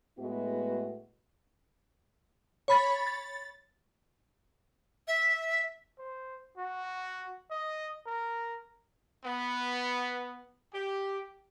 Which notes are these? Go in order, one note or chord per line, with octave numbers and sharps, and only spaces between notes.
A2 G#3 B3 E4 F#4 B4
C#5 B5 A6
A6
E5
C5
F#4
D#5
A#4
B3
G4